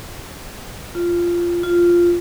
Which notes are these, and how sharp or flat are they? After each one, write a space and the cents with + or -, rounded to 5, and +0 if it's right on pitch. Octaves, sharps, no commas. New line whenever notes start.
F4 -10
F4 -5